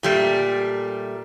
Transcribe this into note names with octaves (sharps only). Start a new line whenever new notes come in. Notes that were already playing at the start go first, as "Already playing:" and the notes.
A#2 G3 A3